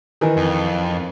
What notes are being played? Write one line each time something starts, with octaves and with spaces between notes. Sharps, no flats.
D#3 E3
F2